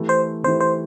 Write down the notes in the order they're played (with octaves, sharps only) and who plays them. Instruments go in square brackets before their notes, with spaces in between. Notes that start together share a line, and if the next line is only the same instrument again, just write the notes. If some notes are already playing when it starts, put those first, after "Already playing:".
Already playing: [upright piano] E3 A3 E4 G4
[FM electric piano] C5
[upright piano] E3 A3 E4 G4 [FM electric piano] C5
[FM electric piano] C5